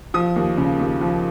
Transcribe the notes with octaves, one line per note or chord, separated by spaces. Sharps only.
F3 D#6
D#2
C#3
D#2
F3